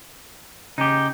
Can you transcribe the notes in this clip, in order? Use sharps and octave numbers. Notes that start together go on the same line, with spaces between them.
C#3 D#4 G4